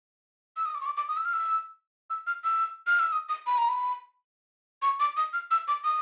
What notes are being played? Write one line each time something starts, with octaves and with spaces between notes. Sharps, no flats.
E6
D#6
D6
C#6
D6
D6
D#6
E6
F6
E6
E6
F6
E6
F6
E6
D#6
D#6
B5
A#5
B5
C#6
D6
D#6
F6
E6
D6
D#6